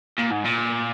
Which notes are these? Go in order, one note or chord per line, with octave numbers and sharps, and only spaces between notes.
A#2
G#2
A#2